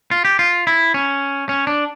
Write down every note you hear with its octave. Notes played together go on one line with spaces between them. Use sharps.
F4
G4
F4
E4
C#4
C#4
D4